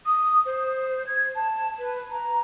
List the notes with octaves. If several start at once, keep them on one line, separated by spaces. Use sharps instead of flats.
D#6
C5
G#6
A5
B4
A#5